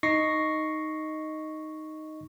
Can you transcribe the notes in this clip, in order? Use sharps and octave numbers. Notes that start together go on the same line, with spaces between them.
D#4 D#5 C#6 A#6 C7